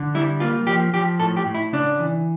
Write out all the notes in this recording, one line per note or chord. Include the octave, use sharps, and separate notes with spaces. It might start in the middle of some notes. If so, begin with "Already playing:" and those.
Already playing: D3
G3 E4
A#3 F4
F3 G4
F3 G4
A2 A4
G4
A2
E4
C#3 D4
E3